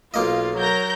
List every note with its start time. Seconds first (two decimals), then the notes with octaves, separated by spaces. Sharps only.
0.14 B1 A#3 F4 D#5
0.57 F#3 A#4 G6 A#6